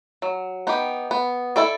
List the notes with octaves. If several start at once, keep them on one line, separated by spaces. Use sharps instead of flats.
F#3
B3 D#4 G4
B3
E4 A4 D5